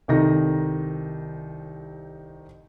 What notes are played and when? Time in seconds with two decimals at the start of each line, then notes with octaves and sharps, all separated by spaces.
0.08 C2 C3 D#3 D#4 A4 A#6